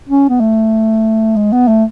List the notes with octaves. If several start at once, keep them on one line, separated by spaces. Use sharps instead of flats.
C#4
B3
A3
G#3
B3
A3